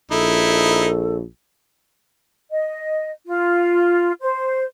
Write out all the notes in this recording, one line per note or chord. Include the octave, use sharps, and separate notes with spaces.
A#1 D#4 E4 A4
D#5
F4
C5